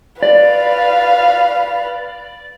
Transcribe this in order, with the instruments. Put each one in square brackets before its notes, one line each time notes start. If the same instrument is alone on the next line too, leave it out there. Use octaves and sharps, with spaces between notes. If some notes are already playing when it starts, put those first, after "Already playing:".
[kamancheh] B4 F5 [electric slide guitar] D5